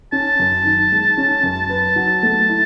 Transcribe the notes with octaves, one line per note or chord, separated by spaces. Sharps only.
C#4 A5
F#2
D#3
G#3
C#4
F#2
B4
F#3
A3
E4